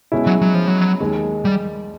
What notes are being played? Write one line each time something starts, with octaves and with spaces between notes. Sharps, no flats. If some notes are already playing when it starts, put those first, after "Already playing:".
B2 G#3 C#4 E4
F#3
F#3
F3
F#3
D#2 D#3 G#3
G3